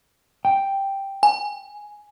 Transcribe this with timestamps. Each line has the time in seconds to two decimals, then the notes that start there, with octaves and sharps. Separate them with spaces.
0.45 G5
1.23 G#5